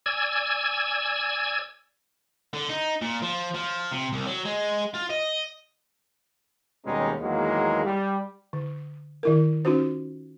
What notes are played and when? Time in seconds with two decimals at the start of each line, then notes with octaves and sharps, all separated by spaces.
0.06 D5 G#5 E6 G#6
2.53 D3
2.69 D#4
3.01 A#2
3.22 F3
3.54 F3
3.92 C3
4.13 C2
4.26 F#3
4.45 G#3
4.95 F4
5.11 D#5
6.85 D#2 B2 G3 G#3 C#4 D#4
7.20 E2 D#3 F#3 G#3 A#3
7.84 G3
8.53 D3
9.23 D#3 E4 A#4
9.65 C#4 D#4 F4 F#4 C5